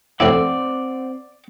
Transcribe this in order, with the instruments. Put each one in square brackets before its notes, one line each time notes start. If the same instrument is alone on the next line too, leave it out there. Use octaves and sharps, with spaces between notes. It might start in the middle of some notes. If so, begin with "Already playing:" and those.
[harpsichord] A2 C3 E4 [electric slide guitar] C4 C5 F#5 [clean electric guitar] D5